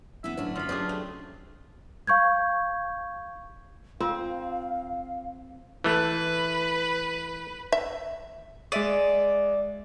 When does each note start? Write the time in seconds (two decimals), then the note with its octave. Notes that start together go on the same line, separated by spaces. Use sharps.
0.24 E3 B3 C#4 E5
0.37 A2 D3 F#3 C#4 D4
0.56 F#2 F4 B5
0.69 F#3 C#4 D4 G4 G#4 C5 D#6 F6
0.89 A3
2.07 F5 C#6 G6 G#6
4.00 C4 F4 F5
5.84 E3 A3 B4
7.72 E5
8.72 G#3 D5 E5 D#7